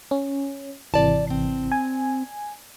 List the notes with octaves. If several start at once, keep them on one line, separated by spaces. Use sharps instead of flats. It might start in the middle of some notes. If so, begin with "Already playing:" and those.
C#4
G#1 C3 E3 D5 A5
C4
G#5